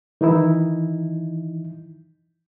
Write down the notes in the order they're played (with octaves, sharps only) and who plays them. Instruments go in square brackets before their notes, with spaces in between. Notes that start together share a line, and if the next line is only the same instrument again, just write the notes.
[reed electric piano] D#3 E3 D#4 E4